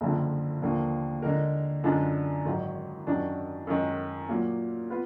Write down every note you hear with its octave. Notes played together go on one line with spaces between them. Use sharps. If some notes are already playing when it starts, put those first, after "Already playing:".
F#1 F2 D3 F3
D#2 D3 F3 A#3
D3 G#3 D#4 A#4
F#2 D3 G#3 D4 F4
G#1 G#2 D#3 F#3
F#2 D#3 F#3 D4
F#2 D#3 G#3
A#2 F#3 A#3
B3 F4 B4